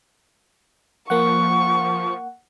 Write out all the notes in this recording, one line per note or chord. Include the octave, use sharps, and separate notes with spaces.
F3 A#3 F#5 C#6